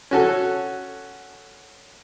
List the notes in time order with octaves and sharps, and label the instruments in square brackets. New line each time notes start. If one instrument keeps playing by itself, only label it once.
[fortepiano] C#4 F#4 A4